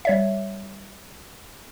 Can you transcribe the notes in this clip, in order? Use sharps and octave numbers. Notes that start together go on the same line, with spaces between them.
G3 C#5 E5